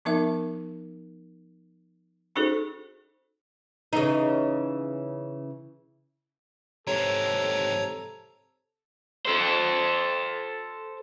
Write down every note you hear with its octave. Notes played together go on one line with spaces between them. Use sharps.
F3 B3 D#4 A#4 E5
C#4 D#4 F#4 G#4 A4 C5
C#3 E3 D#4
G#2 C3 E3 A4 C#5 A#5
A4 C5